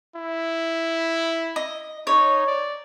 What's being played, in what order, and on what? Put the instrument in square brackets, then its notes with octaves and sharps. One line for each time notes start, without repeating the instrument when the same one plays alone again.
[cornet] E4
[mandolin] D#5
[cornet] D#4 [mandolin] C#5
[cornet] D5